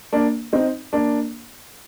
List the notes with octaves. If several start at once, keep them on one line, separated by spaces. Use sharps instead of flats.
A#3 D4
C4 D#4
A#3 D4